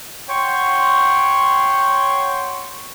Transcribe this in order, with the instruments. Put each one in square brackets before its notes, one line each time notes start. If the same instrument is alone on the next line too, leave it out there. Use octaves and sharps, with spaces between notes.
[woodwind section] C#5 F#5 G5 C6 C#6